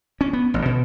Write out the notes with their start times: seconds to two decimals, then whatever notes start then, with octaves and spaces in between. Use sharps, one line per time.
0.21 C#4
0.33 B3
0.54 A1
0.65 B2